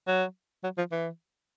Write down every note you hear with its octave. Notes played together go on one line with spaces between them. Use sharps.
F#3
F#3
F3
E3